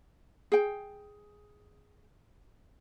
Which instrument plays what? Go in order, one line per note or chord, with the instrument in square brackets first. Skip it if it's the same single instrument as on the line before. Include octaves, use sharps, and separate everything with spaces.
[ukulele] G#4 G5